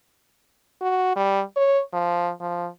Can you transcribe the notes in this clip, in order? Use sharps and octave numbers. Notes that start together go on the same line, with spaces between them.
F#4
G3
C#5
F3
F3